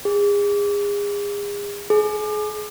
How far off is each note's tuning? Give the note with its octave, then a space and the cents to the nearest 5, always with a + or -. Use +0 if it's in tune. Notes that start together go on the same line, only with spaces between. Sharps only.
G#4 -35
G#4 +30